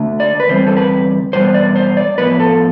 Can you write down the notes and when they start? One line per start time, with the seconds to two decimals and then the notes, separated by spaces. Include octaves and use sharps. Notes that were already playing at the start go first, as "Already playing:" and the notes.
Already playing: D3 A3 D4
0.20 D5
0.40 B4
0.48 E2 D3 G3 C4 C5
0.67 A4
0.77 B4
1.33 E2 B2 G3 B3 C5
1.54 D5
1.76 C5
1.97 D5
2.18 A2 F3 B3 B4
2.40 A4